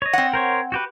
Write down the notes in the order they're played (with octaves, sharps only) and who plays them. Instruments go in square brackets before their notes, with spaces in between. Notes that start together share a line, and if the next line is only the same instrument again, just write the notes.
[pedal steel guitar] C#5 D#5
[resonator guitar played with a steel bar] C4 F#5
[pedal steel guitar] A#4 C5 C#5
F#4 G4 B4